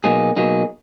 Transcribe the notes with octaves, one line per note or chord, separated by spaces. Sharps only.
B2 F#3 A#3 D#4 G#4
B2 F#3 A#3 D#4 G#4